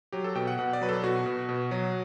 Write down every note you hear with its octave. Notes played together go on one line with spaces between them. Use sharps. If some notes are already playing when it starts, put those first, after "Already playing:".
F#3 G4
A4
B2 G5
F#5
B2 F#5
D5
F#3 B4
A4
B2 F#4
B2
B2
F#3